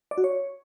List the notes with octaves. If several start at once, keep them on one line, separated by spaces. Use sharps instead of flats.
D5
F#4
C#5